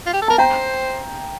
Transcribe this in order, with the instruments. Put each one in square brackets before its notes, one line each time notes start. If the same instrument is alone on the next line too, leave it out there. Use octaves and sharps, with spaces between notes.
[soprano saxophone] F4
G4
A4
[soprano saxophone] A#4 [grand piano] A5
[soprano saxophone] C5 [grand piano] G5 A#5